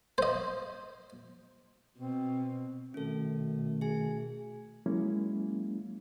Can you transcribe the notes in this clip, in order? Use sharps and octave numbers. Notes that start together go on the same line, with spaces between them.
C5 D#5
B2 C4
B2 D#3 A3 C#4 A4
G#4 G#5
F#3 G#3 A#3 C#4 E4